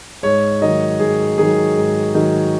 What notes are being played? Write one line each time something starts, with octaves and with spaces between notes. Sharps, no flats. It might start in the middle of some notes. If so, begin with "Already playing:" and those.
G#2 C#5
D#3 F#3 D#5
G#2 G#4
D#3 F#3 G#4
G#2
D#3 F#3